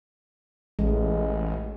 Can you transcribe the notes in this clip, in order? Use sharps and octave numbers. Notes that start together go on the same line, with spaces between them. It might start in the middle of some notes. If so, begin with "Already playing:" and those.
A1 G#3